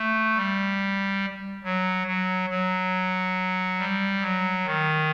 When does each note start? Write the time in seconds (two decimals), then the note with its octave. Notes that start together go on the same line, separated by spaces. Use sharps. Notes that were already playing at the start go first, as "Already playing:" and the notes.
Already playing: A3
0.36 G3
1.64 F#3
2.07 F#3
2.49 F#3
3.78 G3
4.21 F#3
4.65 D#3